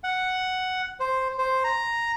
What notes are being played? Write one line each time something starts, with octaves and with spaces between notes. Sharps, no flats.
F#5
C5
C5
A#5